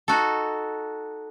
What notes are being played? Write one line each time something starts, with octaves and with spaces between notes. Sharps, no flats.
D#4 F#4 A4